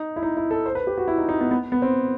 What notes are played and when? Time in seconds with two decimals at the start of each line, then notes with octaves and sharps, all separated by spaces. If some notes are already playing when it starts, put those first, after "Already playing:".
Already playing: D#4
0.16 E4
0.23 D#4
0.37 E4
0.51 A4
0.66 C5
0.75 B4
0.87 G4
0.98 F#4
1.08 E4
1.18 D#4
1.29 D#4
1.41 B3
1.51 B3
1.72 B3
1.82 C4